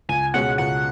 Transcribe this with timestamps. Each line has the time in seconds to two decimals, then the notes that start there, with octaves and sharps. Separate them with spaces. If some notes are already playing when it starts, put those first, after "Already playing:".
0.09 C#2 G#5
0.34 B2 G#3 C#4 F#4 F#5
0.58 C#2 F#5